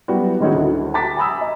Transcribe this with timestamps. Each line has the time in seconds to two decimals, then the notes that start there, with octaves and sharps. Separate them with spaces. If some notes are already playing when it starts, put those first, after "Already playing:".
0.08 F#3 G3 B3 E4 F#4 G4
0.40 D#3 G#3 C#4 D#4 E4 F#4
0.54 D2
0.94 A5 A#5 D6 A6 B6
1.17 G#5 A#5 B5 D#6 E6
1.41 D#5